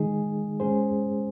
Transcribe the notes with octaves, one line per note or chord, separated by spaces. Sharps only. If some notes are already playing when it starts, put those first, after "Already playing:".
Already playing: D#3 G#3 D#4 G#4
G#3 C#4 G#4 C5